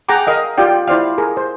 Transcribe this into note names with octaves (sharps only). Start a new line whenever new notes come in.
G#4 F#5 G5 A#5 D6
A#4 D#5 F5
F4 G4 D5 G5
E4 C5 D5 F5
G#4 A#4
C5